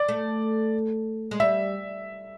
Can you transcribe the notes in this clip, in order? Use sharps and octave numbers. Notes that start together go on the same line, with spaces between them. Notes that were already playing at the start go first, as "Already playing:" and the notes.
Already playing: D5
A3
G#3
G3 E5